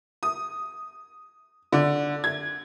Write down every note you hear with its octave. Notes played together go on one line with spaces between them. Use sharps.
D#6
D3
G#6